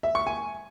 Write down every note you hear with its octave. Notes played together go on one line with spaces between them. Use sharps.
E5
C#6
G#5